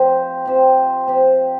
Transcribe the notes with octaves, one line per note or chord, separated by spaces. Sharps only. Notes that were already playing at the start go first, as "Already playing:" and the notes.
Already playing: F3 C4 G4 C5
F3 C4 G4 C5
F3 C4 G4 C5